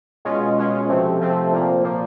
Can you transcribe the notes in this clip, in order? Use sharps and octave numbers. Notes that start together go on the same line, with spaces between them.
B2 G#3 C#4 F4
B2 G#3 C#4 F4
C3 F3 A3 C4
C3 F3 A3 C4
A#2 F3 A#3
A#2 F3 A#3